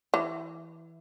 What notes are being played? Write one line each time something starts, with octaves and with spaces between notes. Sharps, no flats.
E3